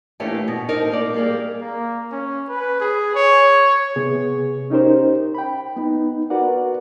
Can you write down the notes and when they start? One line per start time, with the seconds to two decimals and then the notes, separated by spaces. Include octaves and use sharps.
0.20 E3 A3 A#3 C#4 D4 G4
0.48 B2
0.68 C4 D4 D#4 A#4
0.92 A#3 D5
1.14 G3 A#3 G#4
1.61 A#3
2.12 C#4
2.48 B4
2.81 G#4
3.15 C#5
3.96 C3 B3 G#4
4.70 C#4 D#4 G4 A#4 C5
5.35 G5 B5
5.76 B3 D#4
6.30 F#4 A#4 B4 D5 F#5